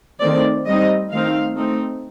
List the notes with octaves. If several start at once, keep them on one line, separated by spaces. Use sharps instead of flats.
D#3 A3 C4 D5
G3 C4 D#4 D#5
D#3 A3 C4 D#4 F5
A3 C4 D#4